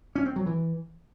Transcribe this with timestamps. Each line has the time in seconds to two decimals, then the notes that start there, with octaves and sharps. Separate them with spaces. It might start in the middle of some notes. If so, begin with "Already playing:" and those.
0.15 C#4
0.26 C4
0.36 F#3
0.46 E3